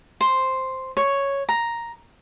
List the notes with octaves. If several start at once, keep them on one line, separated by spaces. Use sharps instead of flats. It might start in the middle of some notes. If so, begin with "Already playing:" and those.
C5
C#5
A#5